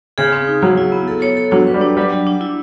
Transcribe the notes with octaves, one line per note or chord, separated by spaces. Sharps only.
C#3 G#4
C4
D#4
F#3 G#4
E4
B3
A4
C#5
A4
F#3 D4
B4
G3
D4
F#3 G3
F#3
D4
E4